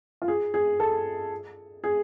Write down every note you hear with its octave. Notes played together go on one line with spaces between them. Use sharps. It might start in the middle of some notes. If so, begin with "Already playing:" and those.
F4
G#4
G#4
A4
G#4